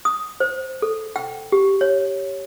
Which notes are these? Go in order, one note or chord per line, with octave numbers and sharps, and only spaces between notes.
D#6
C5
A4
G5
G4
C#5